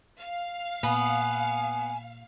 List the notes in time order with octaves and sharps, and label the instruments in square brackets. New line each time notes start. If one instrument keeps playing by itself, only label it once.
[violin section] F5
[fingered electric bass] A#2 [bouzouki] B3 [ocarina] G#5